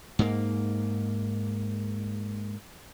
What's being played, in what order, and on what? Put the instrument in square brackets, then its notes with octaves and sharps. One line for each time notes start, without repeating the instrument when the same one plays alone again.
[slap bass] G#2 A#3